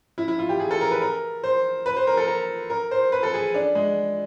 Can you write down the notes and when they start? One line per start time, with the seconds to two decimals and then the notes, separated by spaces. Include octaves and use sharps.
0.18 E4
0.28 E4
0.39 F4
0.49 G4
0.60 G#4
0.71 A4
0.81 A#4
0.91 B4
1.02 A#4
1.44 C5
1.86 B4
1.96 C5
2.07 A#4
2.17 A4
2.28 A#4
2.70 A#4
2.91 C5
3.12 B4
3.23 A4
3.34 G#4
3.54 D4
3.75 G#3